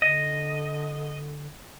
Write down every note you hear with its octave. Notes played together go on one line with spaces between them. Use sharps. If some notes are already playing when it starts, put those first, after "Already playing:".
D3 D#5